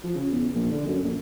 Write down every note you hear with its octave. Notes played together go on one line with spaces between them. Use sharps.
F3
C#3
E2
A#1
D3
F#2
A#1